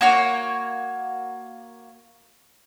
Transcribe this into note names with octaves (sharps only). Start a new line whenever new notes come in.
A#3 F#4 C#5